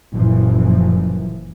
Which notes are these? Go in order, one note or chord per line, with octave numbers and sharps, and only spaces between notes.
F#1 F#2 A#2 E3 F3